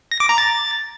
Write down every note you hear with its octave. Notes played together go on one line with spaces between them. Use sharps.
A#6
D6
A#5
A6